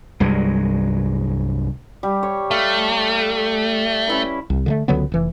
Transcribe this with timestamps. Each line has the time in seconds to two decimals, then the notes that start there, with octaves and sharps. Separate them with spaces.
0.20 C2 G2 F#3 G#3
2.03 G3
2.23 C#5
2.51 A3 F5
4.08 C#4 E4 B4
4.50 C2
4.66 D3 D#3 A3
4.88 C#2 D3 F#3 B3
5.12 F1 E3